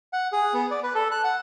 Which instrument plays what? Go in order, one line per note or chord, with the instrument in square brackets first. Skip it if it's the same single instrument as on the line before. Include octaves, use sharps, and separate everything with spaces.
[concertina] F#5
G#4
B3
D5
B4
A4
F#6
F#5